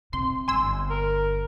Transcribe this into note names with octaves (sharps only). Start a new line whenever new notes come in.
C3 C6
G1 G#5 C6 E6
A#4